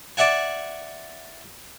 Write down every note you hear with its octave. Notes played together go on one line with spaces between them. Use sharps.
D5 E5 F#5 G#5